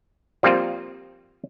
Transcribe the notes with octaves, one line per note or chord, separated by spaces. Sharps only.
F3 G3 A#3 C4 F4